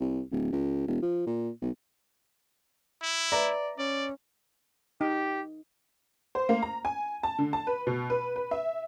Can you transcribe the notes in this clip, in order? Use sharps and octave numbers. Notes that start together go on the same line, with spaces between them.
C2
D1
C#2
E1
F3
A#2
B1
E4
B4 D5 E5 A#5
C#4 D5
D#4 G4
C5
A#3
A#5
G#5
A5
D3
A5
B4
B2
B4
B4
E5